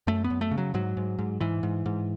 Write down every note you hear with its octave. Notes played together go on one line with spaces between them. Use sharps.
F#2 A3
B3
F#2
A3
C#3
F#3
G#2 F#3
G#2
G#2
G#2 E3
G#2
G#2